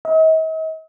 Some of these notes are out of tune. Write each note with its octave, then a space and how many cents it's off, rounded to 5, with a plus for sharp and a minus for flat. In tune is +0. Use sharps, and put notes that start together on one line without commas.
D#5 +45